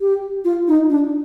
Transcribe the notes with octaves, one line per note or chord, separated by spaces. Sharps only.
G4
F4
D#4
D4